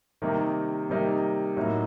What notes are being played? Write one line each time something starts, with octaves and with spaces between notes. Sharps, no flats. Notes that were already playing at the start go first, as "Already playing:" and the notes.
C3 D#3 G3 A#3 D#4
C3 D#3 G3 A#3 D#4
A2 F#3 A#3 D#4